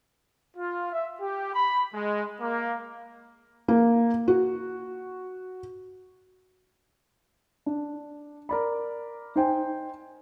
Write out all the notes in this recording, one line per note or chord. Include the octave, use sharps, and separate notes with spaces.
F4
E5
G4
B5
G#3
A#3
A#3
F#4
D4
A#4 D5 B5
D#4 C5 G5 G#5